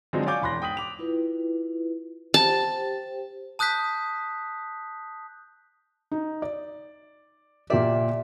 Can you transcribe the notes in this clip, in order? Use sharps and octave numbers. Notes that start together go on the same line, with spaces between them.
D3 F3 F#3 G#3 C4 D#4
C#5 D5 F5 G#5 D6 G6
E1 B5 C6 F#6 A#6
G#2 G5 D#6 B6 F#7
D6 F7
E4 F4 B4
G4 C5 G5 A5
A5 D#6 F#6 G6 B6
D#4
D5
A#2 G4 A#4 D5 E5